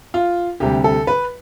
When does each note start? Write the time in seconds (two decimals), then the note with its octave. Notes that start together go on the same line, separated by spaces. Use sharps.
0.14 F4
0.60 D2 C3 G3 G4
0.84 A4
1.07 B4